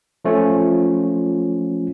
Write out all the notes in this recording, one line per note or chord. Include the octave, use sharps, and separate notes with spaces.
F3 A3 C#4 F4